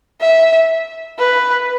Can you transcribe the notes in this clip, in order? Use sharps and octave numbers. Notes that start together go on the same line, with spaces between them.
E5
B4